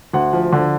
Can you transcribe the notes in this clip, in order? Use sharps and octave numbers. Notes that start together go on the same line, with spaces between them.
D2 F#5
F3
D3